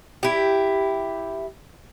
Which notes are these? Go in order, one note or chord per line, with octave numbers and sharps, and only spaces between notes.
E4 G4